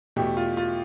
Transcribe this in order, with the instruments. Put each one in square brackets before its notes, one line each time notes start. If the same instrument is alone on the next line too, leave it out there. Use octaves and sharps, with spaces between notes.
[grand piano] E2 B2 A3 [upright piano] G4
[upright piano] F4
F4